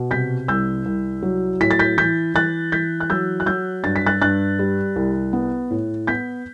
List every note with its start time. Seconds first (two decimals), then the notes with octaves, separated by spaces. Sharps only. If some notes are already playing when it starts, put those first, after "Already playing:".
Already playing: B2
0.11 C3 G6 B6
0.48 C2 E6 G6
0.85 C2
1.23 F#3
1.60 A2 B6
1.71 A6
1.79 G6 B6
1.98 E3 G6 B6
2.34 E3 F#6 A6
2.72 E3 G6 B6
3.00 F#6
3.10 F#3 E6 G6
3.40 F#6
3.46 F#3 E6 G6
3.84 G2 A6
3.96 B6
4.06 F#6 A6
4.21 G2 F#6 A6
4.59 G3
4.96 C2
5.33 B3
5.71 A2
6.07 B3 G6 B6